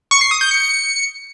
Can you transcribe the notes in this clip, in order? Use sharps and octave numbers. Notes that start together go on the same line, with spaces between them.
C#6
C7
D#6
G6
C#7